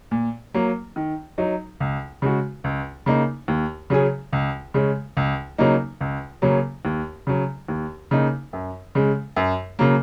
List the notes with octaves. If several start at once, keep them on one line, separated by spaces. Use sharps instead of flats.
A#2
F#3 A#3
D#3
F#3 D#4
C#2
C#3 G#3 F#4
C#2
C#3 A#3 D#4
D#2
C#3 F#3 C#4 G#4
C#2
C#3 G#3 C#4
C#2
C#3 F#3 A#3 D#4
C#2
C#3 F#3 A#3 C#4
D#2
C#3 F#3
D#2
C#3 A#3 D#4
F#2
C#3 G#3
F#2
C#3 F#3 A#3